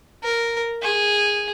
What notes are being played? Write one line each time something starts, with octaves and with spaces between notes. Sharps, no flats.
A#4
G#4